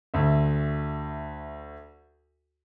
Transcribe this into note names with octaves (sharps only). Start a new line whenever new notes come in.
D2 E5